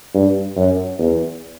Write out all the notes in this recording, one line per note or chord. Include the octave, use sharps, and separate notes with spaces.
G2
F#2
E2